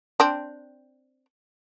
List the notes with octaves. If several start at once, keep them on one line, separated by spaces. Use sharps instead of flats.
C4 D4